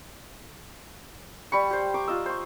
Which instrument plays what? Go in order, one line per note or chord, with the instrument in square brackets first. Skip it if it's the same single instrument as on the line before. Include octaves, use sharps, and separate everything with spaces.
[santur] G3 B5 C#6
G4 C5
A#5 C#6 D6
F4 D#5 E6
C5 C#6